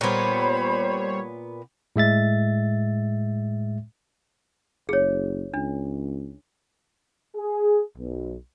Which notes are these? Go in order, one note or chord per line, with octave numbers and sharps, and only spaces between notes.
A#2 G3 B3 C5 C#5 B5
A2 G#3 E5 A6
F#1 G#4 C#5
C#2 D4
G#4
B1